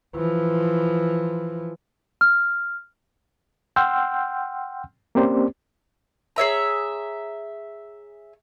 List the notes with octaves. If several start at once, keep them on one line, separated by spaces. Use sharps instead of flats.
E3 F3
F6
F#5 G5 C6 E6 F6 G6
A#3 C4 C#4 G4 C5 D5
G#4 C#5 E5 A#5